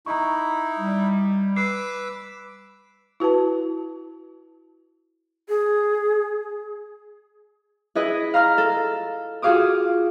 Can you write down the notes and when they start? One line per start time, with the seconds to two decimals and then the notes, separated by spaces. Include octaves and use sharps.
0.06 D#4 E4 A#5 C#6
0.79 G3
1.56 B4 D6 E6 C7
3.20 E4 F#4 B4 A5
5.49 G#4
7.95 E4 G#4 B4 D#5
8.34 F5 A#5 F6
8.58 A4
9.42 F4 F#4 G#4 F5 D6 D#6